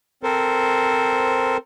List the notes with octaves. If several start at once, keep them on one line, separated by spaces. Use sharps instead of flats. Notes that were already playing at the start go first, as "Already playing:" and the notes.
C4 A4 A#4 C5